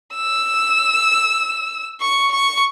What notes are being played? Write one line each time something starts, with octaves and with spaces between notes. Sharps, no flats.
E6
C#6
C#6